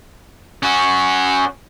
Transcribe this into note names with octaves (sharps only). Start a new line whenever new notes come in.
C#4 F#4